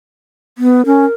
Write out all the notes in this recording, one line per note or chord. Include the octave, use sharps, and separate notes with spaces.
B3
C#4 A#4